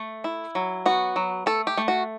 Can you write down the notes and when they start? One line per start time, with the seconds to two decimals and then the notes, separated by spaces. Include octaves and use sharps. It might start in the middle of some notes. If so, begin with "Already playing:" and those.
Already playing: A3
0.24 E4
0.55 F#3
0.86 B3 F#4
1.16 F#3
1.46 A3 A4
1.67 G4
1.77 A3
1.88 F#4